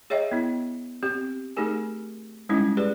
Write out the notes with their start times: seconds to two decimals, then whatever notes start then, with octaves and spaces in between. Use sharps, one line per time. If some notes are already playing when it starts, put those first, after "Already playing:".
0.10 G#4 C#5 D#5 E5 G5
0.32 B3 E4
1.03 C4 G4
1.57 A3 D#4 G4 G#4 A#4 G#5
2.49 G3 G#3 C#4 D#4 E4
2.77 G4 G#4 B4 D5